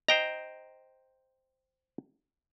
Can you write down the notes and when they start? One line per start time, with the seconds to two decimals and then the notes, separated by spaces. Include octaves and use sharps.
0.08 C5 D#5 G5 A#5